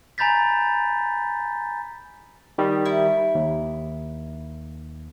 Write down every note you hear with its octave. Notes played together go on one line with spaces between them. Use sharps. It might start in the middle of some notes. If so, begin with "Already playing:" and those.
G#5 A#5 B5 G6 A6 B6
D#3 G3
E4
D#2